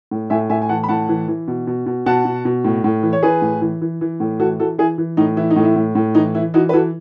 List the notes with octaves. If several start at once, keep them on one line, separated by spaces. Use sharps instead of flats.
A2
A2 E5 G#5
A2 E5 G#5
G#5
E3 F#5 A5
B5
A2 F#5 A5
E3
E3
B2
B2
B2
B2 F#5 A5
B2
B2
A2
A2
E3
C#5
E3 G#4 B4
A2
E3
E3
E3
A2
E3 F#4 A4
E3 F#4 A4
E3 E4 G#4
E3
A2 D#4
E3 E4
D#4
A2
E4
A2
A2
E3 D#4
E3 E4
E3 D#4 F#4
B4
E3 F#4 A4